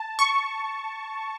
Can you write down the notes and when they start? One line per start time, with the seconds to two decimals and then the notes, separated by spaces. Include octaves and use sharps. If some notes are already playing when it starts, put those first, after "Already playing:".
Already playing: A5
0.19 C#6